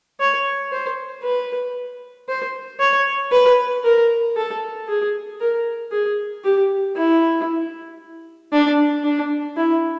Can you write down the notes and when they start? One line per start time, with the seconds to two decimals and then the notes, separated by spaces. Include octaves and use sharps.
0.20 C#5
0.72 C5
1.23 B4
2.28 C5
2.80 C#5
3.32 B4
3.84 A#4
4.37 A4
4.88 G#4
5.40 A#4
5.92 G#4
6.44 G4
6.96 E4
8.53 D4
9.04 D4
9.57 E4